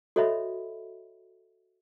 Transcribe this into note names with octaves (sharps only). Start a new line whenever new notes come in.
F#4 A4 C#5 D#5 E5 B5